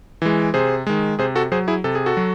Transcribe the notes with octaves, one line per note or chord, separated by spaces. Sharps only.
E3 G#3
C3 G#4 C5
D#3 G#3
C3 G#4 C5
F#4 A4
F#3 G#4 C5
E4 G#4
C3 A4
G#4
F#4 A4
F#3